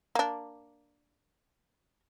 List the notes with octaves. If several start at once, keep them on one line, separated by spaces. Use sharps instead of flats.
A#3 D4